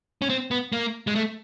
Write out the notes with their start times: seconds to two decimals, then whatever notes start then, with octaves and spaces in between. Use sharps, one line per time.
0.22 C#4
0.30 C4
0.51 B3
0.72 A#3
1.07 G#3
1.15 A3